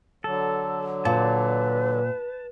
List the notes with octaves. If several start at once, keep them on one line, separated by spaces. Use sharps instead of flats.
D3 F#3 A4
A#2 B4 A5